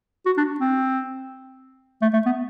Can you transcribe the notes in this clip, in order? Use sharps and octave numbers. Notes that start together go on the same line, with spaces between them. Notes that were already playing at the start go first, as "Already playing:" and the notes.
F#4
D4
C4
A3
A3
B3